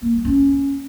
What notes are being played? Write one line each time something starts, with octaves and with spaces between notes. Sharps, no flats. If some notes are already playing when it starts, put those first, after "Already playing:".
A#3
G3
C#4